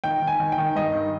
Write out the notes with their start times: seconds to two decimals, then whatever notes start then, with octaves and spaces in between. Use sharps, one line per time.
0.04 D#3 G5
0.22 D#3
0.27 G#5
0.40 D#3
0.52 G5
0.58 D#3
0.75 G2 D#5
0.93 D#3